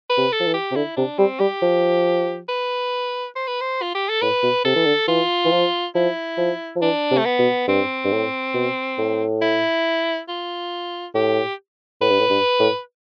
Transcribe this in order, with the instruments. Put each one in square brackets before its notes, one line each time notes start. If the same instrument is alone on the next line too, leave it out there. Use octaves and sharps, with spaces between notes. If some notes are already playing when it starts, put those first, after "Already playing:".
[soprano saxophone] B4
[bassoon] C3
[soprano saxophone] A4
[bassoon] F3
E3
[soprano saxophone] G4
[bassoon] C3
[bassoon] D3 [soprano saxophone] E4
[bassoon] C3 [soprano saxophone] D4
[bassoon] G3 [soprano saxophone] C4
[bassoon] G3 [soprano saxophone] G4
[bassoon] F3
[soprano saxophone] B4
C5
B4
C5
F4
G4
A4
[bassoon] A2 [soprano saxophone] B4
[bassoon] B2
[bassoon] C3 [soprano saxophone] A4
[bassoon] E3
D3
[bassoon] E3 [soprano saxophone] F4
[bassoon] E3
F3
[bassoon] F3 [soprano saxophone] E4
[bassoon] F3
F3
[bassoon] E3 [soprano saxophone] D4
[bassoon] C3
[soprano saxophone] A3
B3
[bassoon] B2
[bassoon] G2 [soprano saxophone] C4
[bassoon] G2
A2
B2
A2
[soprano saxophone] E4
F4
[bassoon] A2 [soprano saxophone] G4
[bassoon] A2 [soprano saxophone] B4
[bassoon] G2
A2
G2
A2